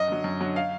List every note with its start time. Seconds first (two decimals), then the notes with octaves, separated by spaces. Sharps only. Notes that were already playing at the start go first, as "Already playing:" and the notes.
Already playing: F#2 D#5
0.08 D3 F#3
0.24 F#2
0.40 D3 F#3
0.56 F5